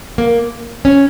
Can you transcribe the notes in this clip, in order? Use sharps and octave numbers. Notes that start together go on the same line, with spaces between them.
A#3
C#4